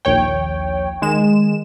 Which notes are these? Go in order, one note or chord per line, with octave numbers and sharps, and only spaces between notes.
A#1 D#2 C#5 G5
D#3 G#3 E7